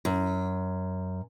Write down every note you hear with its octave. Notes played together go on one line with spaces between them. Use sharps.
F#2